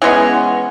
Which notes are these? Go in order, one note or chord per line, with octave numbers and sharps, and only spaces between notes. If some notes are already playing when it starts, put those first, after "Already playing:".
E3 G#3 B3 C#4